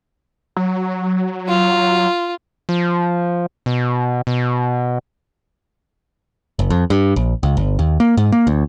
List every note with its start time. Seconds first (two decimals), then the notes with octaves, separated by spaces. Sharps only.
0.57 F#3
1.48 F4
2.69 F3
3.66 B2
4.27 B2
6.59 F#1
6.70 F2
6.90 G2
7.16 A#1
7.43 C#2
7.57 G1
7.79 D#2
8.00 A#3
8.17 G#2
8.32 A#3
8.47 D2